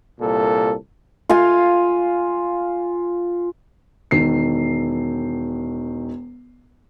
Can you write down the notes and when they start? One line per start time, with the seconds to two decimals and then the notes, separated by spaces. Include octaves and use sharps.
0.20 C2 A#2 A4
1.30 F4 F5 G#5
4.11 E1 D#3 C7